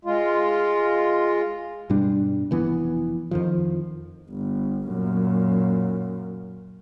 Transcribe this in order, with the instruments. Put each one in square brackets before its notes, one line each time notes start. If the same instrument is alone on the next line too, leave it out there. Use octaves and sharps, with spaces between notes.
[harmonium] G#3 F4
[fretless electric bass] G2 B2 G3 D4
F1 E3 B3
F2 D#3 F3
[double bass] G1
F#2 A#2